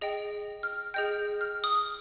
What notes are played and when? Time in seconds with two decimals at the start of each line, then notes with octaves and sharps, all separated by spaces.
0.01 G#4 D#5 G5
0.63 F6
0.94 G#4 D#5 G5 G6
1.41 F6
1.64 D#6